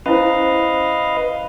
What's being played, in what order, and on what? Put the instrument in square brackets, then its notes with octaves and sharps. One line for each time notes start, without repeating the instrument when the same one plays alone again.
[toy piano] C#4 E4 C5 [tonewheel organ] B4 D#5 F5